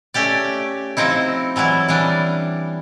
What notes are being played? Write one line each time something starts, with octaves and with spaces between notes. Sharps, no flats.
A3 C#4 G4 D5
F3 C4 D#4 E4
E3 F#3 G3 E4
E3 G3 D4